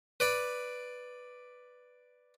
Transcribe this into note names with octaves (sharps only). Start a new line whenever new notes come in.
B4 D5 B5